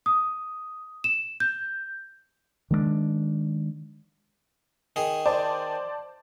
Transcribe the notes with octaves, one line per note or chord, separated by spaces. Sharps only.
D#6
E7
G6
D#3 G#3 A3 D4
D#3 G#4
C5 D5 A5